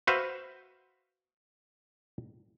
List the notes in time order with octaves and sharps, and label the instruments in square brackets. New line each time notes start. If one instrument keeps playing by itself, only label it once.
[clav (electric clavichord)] F#4 B4 C5 E5 F5